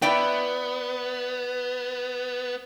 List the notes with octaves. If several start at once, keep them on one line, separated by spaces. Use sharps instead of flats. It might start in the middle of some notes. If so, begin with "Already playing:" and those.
B3 E4 D5 G5